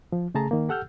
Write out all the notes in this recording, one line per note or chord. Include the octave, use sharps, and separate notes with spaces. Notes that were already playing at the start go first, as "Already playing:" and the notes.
F3
C#3 A3 G#4 A5 A#5
D#3 A#3
G4 A4 F#5 E6 F6 G6